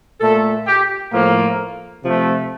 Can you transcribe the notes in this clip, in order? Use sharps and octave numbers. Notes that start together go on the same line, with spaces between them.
A#2 A3 A4
G4
A2 F3 A3 A#3
C3 F3 A3